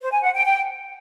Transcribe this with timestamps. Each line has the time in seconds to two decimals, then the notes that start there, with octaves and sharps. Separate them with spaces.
0.01 C5
0.12 G#5
0.23 F#5
0.33 G5
0.44 G5